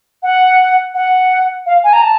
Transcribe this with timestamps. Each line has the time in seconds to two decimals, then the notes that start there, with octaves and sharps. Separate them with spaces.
0.23 F#5
0.94 F#5
1.66 F5
1.84 G#5
1.93 A#5
2.02 A5